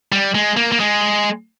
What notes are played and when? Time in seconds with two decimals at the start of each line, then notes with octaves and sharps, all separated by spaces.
0.12 G3
0.35 G#3
0.57 A#3
0.72 A#3
0.80 G#3